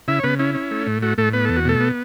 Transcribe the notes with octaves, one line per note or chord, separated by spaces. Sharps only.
C#3 E4 E5
C#5
C#3 B3 B4
C#4 E4
C#4
A3
A2
A3 F#4
A2 A3 A4
B3 B4
E2 A4
F#4
B2 A3 A4
B3